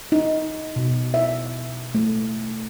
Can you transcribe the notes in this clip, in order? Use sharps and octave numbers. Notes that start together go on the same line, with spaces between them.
D#4
B2
E5
A3